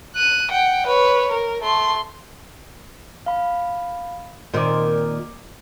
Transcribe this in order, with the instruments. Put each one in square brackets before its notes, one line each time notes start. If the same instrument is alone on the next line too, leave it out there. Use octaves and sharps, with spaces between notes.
[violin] F#6 D#7
F#5 G5
B4 C#5
A#4
A3 C6
[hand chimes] F5 B5
[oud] A#2 D#3 C4 [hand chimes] D5 D6